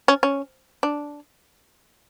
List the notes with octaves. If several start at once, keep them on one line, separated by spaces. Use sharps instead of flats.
C#4
C#4
D4